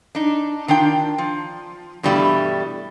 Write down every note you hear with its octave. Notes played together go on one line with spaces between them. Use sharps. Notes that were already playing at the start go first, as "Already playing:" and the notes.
D4 D#4
D#3 D4 F4 G5
F3
G2 B2 E3 G3 A3 E4